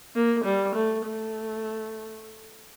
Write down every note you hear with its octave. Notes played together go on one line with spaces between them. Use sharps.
A#3
G3
A3
A3